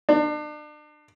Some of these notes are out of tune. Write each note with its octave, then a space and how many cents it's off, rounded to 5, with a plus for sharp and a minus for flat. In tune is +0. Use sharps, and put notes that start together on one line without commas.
D4 +35